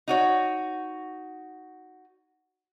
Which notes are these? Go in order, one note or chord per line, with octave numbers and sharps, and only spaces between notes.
D#4 F#4 C#5